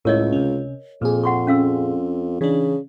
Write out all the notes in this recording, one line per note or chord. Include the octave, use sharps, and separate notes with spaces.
C#2 A2 E4 A#4 C#5 D#5
C3 C#4
F2 A#2 G#4
F#5 C6 C#6
C#4 F5 E6
C#3 E3 D4